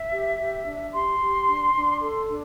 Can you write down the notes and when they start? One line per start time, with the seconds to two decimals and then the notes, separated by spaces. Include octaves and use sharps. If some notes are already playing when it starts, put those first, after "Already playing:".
Already playing: E5
0.11 G4
0.38 G4
0.66 D4
0.92 G4 C6
1.20 G4
1.47 D4
1.75 D4
2.01 A4 C6
2.29 D4